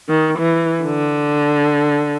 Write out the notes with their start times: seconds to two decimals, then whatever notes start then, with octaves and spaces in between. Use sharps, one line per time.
0.09 D#3
0.38 E3
0.84 D3